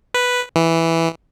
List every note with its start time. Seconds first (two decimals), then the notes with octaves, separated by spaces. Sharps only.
0.14 B4
0.56 E3